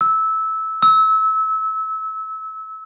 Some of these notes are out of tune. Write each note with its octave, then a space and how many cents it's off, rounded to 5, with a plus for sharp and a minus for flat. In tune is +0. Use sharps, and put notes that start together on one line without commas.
E6 -15
E6 -25